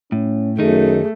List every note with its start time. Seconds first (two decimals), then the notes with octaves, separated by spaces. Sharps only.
0.12 A2 C#4
0.59 F#2 D#3 A3 D#4 G#4